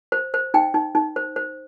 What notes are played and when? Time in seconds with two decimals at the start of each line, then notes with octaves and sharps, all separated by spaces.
0.12 C5
0.34 C5
0.54 D#4 G5
0.74 D#4
0.95 D#4
1.16 C5
1.36 C5